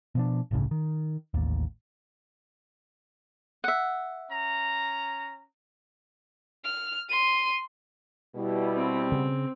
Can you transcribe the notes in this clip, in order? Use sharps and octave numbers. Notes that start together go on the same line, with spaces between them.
B2 F3 D4
G1 C#2 A2 C#3
D#3
A1 D#2
E5 F#5
C#4 A#5
F6
C6 D#7
B2 G3 E4
C4
C#3